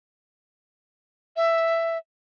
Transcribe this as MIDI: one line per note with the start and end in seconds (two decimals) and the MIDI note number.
1.36 1.98 76